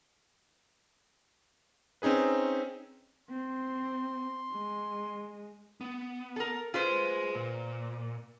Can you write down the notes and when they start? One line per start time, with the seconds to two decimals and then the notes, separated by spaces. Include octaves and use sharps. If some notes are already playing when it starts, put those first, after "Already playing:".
2.02 C4 C#4 D#4 G#4 B4
3.29 C4 C6
4.52 G#3
5.81 B3
6.36 A4 A#4
6.74 F4 G#4 B4 C5 C6
7.35 A#2